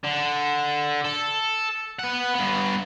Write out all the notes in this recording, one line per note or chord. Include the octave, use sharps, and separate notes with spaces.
D3
A4
B4 F#5
G2 B3